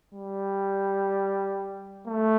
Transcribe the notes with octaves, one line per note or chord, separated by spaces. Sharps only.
G3
A3